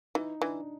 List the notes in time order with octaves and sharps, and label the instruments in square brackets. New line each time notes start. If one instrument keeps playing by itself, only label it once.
[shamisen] E3 [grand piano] D#4
[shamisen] E3 [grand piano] D4